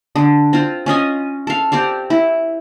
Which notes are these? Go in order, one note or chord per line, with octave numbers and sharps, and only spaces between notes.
D3
C4 F4
C#4 F4 D#5 G#5
A4 F5
C4 G4 D5 F5
E4